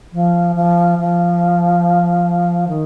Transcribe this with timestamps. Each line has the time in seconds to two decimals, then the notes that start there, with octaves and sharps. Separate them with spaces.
0.13 F3
0.55 F3
0.98 F3
2.68 D#3